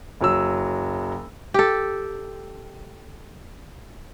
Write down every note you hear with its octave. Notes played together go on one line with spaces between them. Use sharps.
F#1 F#3 E6
G4 A4